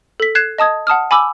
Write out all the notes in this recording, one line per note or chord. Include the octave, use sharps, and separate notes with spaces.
A4 B6
F#6 G#6 C7 E7
D#5 A5 D#6 G#6
F#5 A5 D#6 F6
G#5 B5 D6 E6